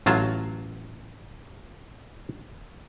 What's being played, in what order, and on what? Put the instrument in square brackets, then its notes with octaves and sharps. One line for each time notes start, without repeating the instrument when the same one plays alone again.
[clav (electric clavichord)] A1 F#3 F4 A5